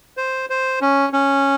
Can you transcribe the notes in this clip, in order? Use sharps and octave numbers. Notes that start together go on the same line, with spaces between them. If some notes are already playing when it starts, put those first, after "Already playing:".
C5
C5
C#4
C#4